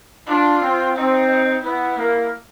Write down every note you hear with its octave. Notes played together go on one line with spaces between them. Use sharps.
D4 F4
C4
C4 D#4
B3 E4
A#3